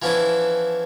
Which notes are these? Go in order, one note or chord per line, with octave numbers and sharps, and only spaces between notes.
E3 F3 B3 C#4 D4 E4